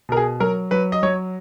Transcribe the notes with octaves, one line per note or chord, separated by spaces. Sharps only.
B2 A#4
G#4
F#3 A#4
F#3 B4
D#5
F#3 C#5